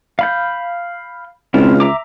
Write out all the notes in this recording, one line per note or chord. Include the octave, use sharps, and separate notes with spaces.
F5 B5 G6
C#2 C4 E4 F4
E5 A#5 D6